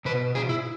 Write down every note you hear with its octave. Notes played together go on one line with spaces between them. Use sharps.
B2 B4
G#4
E4